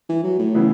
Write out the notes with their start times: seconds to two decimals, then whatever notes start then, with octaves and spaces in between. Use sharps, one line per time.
0.09 E3
0.23 F#3
0.38 A2
0.54 C#3 E3 B3 E4 G#4